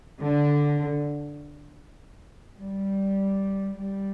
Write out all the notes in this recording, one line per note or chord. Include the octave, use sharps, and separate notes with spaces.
D3
G3
G3